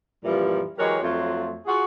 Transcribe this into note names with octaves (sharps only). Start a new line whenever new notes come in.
F#2 A#2 E3 F3 G3
E3 F#3 G#3 G4 A#4 C#5
F2 F#3 A3 F4
F4 F#4 G#4